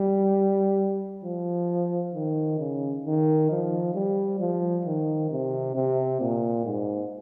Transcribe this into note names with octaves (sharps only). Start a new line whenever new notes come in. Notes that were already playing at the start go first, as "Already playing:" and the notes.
Already playing: G3
F3
D#3
C#3
D#3
F3
G3
F3
D#3
C3
C3
A#2
G#2